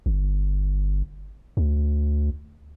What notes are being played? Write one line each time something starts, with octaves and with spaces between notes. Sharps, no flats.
G1
D2